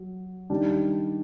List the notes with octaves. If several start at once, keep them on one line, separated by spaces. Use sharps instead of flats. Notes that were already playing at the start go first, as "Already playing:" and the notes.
Already playing: F#3
D#3 G3 D4